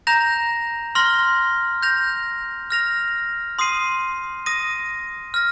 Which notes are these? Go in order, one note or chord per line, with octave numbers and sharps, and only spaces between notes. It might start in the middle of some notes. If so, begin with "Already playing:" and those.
A#5 G6 A#6 F7
C6 F6 A#6 G7
G6 A#6 F7
F6 A#6 F7
C6 D#6 C7 D#7
D#6 A#6 D#7
F6 A#6